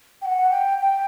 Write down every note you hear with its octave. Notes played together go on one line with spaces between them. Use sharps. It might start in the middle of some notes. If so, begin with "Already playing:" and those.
G5
F#5
G5
G5